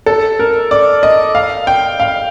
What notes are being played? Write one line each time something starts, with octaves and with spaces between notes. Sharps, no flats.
A4
A#4
D5
D#5
F5
G5
F5